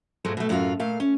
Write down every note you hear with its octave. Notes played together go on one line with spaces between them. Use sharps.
G#2 B2 F3 F#3 G#3 A3
B2 A3
F#2 A2 A3 F4 F#4 F5
A#2 A3 F5
C#4